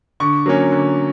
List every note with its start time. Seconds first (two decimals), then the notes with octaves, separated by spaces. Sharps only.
0.20 D3 C#6
0.46 F#3 A#3 C#4
0.72 D3